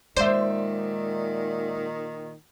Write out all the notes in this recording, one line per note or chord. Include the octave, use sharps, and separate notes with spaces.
A#2 D#3 G#3 C5 D5 E5